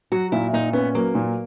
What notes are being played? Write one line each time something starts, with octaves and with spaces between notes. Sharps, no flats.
F#3 F#4
A#2 E4
A#2 D#4
B3 C#4
F#3 A#3
A#2